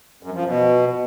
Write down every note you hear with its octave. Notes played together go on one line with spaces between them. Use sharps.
F#2
F3
B2